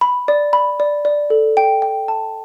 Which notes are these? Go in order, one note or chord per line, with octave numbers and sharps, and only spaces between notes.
B5
D5
B5
D5
D5
A4
G5
G5
A5